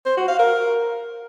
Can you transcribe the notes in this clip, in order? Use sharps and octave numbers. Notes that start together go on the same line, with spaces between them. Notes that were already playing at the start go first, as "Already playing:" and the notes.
C5
F#4
F5
A#4